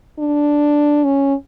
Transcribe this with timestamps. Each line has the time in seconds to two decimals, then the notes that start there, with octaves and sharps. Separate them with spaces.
0.19 D4
1.04 C#4